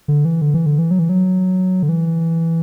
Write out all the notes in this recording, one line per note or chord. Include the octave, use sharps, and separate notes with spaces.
D3
E3
D3
E3
D3
E3
F#3
E3
F#3
D3
E3